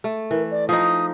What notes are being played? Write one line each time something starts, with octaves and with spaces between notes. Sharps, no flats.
A3
E3 A#4
D5
F3 D#4 D#6